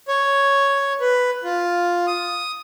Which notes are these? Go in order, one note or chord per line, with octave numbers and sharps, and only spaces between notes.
C#5
B4
F4
D#6